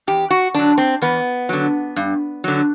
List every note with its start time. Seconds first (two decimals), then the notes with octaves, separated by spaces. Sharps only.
0.07 E2 G4
0.31 F#4
0.55 D3 F#3 D4
0.78 C4
1.02 E2 B3
1.49 D3 F#3
1.96 G2
2.44 D3 F#3